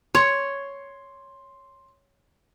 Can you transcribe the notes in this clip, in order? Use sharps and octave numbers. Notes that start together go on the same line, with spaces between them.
C#5 C6